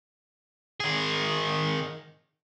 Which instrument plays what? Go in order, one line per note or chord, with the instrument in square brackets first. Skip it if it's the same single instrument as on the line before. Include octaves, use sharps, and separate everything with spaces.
[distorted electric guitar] D#3 G#4